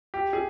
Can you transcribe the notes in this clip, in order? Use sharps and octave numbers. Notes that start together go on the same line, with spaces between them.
G4
G#4